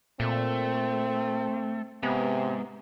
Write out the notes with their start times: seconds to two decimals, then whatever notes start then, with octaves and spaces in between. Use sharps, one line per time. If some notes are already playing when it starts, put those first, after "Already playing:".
0.20 A#2 A3 C4
2.03 G#2 C3 B3